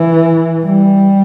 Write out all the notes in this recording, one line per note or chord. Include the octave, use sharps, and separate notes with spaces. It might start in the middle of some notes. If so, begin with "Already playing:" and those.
Already playing: E3
G3